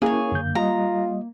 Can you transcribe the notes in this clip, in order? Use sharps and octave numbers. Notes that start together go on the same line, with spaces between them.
A#3 C#4 E4 G#4 A#4 C#5
F#2 D3 G6
G3 F4 D#5 A#5